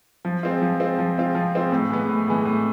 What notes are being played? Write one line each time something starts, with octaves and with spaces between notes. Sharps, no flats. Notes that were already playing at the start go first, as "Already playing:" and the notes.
F3
G#3 C4 F4
F3
G#3 C4 F4
F3
G#3 C4 F4
F3
G#3 C4 F4
A2
E3 G#3 B3
A2
E3 G#3 B3
A2